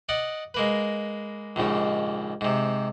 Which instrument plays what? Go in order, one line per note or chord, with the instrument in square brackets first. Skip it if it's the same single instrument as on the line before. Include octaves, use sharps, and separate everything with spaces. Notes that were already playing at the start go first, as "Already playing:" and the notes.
[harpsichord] D5 D#5 F#5
G#3 A#3 B4
A#1 D#2 G#2 C#3
G#2 C3